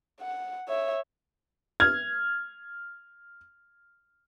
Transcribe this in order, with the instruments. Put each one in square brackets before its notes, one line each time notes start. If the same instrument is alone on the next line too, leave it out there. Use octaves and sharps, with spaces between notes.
[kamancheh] F#5
C#5 E5
[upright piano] F6 G#6